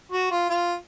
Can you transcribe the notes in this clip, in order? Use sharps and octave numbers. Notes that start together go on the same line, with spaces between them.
F#4
F4
F4